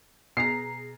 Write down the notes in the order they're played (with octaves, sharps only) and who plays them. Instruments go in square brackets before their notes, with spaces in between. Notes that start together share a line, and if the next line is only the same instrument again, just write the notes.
[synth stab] B2 G#4 A#5 [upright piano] C7